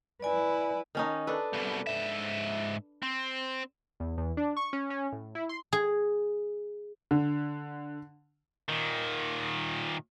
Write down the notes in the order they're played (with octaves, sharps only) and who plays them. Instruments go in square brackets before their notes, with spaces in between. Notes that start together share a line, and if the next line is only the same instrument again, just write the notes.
[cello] E4 B4 [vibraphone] D5 G#5
[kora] D#3 C#4 D#4
D4 A4 B4
[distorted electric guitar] C2 B2
G#2 E5
C4
[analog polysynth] E2
E2
D4
C#6
C#4
C#4
A2
E4
C6
[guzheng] G#4
[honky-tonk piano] D3
[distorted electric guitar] A#2 D#3